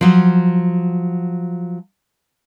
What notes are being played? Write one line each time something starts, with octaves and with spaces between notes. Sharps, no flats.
F3 F#3